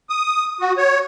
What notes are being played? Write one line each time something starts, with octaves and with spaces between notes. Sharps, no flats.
D#6
F#4
C#5